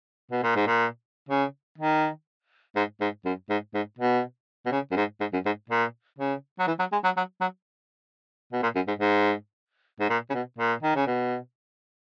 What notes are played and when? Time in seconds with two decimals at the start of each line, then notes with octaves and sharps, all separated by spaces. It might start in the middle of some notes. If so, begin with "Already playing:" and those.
0.31 B2
0.43 A#2
0.56 G#2
0.67 A#2
1.29 C#3
1.78 D#3
2.76 G#2
3.01 G#2
3.25 F#2
3.49 G#2
3.74 G#2
3.99 B2
4.66 B2
4.72 C#3
4.91 F#2
4.96 G#2
5.20 G#2
5.33 F#2
5.46 G#2
5.70 A#2
6.19 C#3
6.59 F#3
6.67 E3
6.79 F#3
6.92 G#3
7.04 F#3
7.17 F#3
7.41 F#3
8.53 B2
8.63 A#2
8.75 F#2
8.88 G#2
8.99 G#2
10.00 G#2
10.10 A#2
10.30 C#3
10.34 B2
10.58 A#2
10.83 D#3
10.96 C#3
11.07 B2